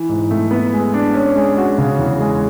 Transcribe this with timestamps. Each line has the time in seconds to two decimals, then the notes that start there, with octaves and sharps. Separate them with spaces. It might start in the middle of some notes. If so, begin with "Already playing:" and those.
Already playing: E3
0.09 G#2
0.31 A3
0.51 B3
0.73 G#3
0.94 D4
1.14 C#4
1.36 G#3
1.58 F#4
1.78 C#3
1.99 E2
2.20 G#3